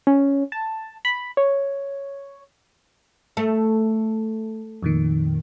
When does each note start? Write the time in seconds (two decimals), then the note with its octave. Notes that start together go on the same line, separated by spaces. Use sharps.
0.07 C#4
0.52 A5
1.05 B5
1.37 C#5
3.37 A3
4.83 F2 A#2 D#3